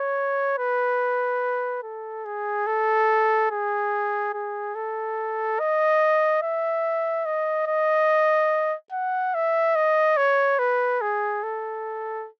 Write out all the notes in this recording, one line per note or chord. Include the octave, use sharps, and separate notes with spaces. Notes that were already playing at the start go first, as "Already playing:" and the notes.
Already playing: C#5
B4
A4
G#4
A4
G#4
G#4
A4
D#5
E5
D#5
D#5
F#5
E5
D#5
C#5
B4
G#4
A4